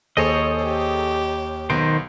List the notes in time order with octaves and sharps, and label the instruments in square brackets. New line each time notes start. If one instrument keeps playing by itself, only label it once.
[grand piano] D#2 [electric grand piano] G#4 A4 C5 [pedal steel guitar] C#5 D#5
[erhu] G4
[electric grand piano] B1 B3 D7 [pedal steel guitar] D#3 C5